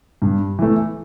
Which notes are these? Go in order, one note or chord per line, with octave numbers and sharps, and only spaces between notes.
G2
E3 A3